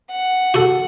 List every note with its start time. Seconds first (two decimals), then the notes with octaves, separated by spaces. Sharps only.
0.11 F#5
0.54 F#4 A4